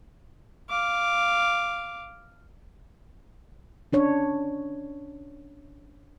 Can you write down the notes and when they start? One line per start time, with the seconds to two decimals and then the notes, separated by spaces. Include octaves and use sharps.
0.70 F5 D6
3.93 C#4 D4 C#5